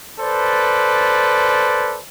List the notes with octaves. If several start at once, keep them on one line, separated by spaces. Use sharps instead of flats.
A4 B4 C5 D5